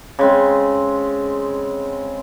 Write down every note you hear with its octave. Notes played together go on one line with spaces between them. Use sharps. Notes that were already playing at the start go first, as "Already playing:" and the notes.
C#3 G#3 C4